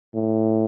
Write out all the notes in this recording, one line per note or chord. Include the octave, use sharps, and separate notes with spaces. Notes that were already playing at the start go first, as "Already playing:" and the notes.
A2